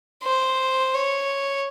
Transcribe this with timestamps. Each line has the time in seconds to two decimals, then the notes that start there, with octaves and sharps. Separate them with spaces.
0.23 C5
0.94 C#5